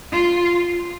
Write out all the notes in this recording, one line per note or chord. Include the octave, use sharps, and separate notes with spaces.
F4